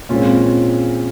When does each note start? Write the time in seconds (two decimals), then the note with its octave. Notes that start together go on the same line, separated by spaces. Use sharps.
0.09 A#2 G#3 C4 C#4 F4